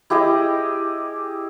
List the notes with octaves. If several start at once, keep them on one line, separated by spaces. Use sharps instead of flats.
E4 G4 G#4 D#5